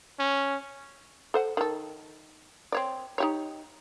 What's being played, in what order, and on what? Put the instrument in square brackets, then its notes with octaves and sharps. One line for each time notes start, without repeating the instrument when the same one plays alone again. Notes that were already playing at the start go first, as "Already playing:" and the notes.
[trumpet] C#4
[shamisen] A4 C5 F#5
D#3 A4
C4 C#5 D5
D#4 G4 C#5